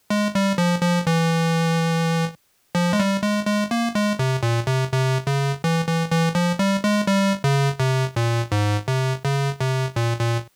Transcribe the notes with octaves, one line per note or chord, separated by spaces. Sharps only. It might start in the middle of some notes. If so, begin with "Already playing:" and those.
G#3
G3
F3
F3
E3
F3
G#3
G3
G#3
G#3
A#3
G#3
C3
A#2
C3
C3
C#3
E3
E3
E3
F3
G3
G#3
G3
C#3
C3
A#2
G#2
C3
C#3
C3
A#2
A#2